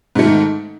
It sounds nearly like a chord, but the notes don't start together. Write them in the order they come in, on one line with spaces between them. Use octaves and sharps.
G#2 A3 D#3